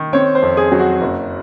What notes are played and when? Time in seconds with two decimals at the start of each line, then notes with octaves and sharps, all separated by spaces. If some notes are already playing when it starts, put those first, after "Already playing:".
Already playing: D#3
0.13 C4 C#5
0.35 C5
0.42 F2
0.57 G#4
0.72 F#3
0.79 F#4
1.01 F#1